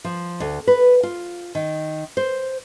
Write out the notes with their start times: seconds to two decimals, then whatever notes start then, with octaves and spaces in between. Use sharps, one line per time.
0.04 F3
0.40 D2
0.67 B4
1.03 F4
1.55 D#3
2.17 C5